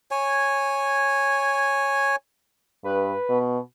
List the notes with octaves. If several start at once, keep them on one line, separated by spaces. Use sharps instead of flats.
C#5 G#5
G2 B4
B2